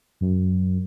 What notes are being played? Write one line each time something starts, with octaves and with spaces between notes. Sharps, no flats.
F#2